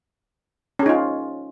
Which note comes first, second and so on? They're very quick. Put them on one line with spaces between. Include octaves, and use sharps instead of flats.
C#4 G#4 D#4 F4